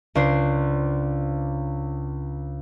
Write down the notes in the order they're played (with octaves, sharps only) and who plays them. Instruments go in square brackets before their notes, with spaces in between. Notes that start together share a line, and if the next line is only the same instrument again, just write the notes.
[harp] C#2 D4 C5 C6